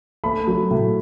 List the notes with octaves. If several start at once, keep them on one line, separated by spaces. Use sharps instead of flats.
A3 B5
F#3
A2